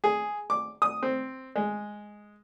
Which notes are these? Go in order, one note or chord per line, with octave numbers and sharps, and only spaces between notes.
G#4
D6
D#6
C4
G#3